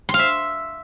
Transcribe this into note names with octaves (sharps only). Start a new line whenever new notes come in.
C6
F5
E5